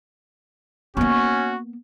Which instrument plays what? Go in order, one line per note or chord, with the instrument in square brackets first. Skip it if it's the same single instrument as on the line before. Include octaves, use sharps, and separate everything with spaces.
[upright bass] A#3 B3 [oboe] C#4 [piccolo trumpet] F#4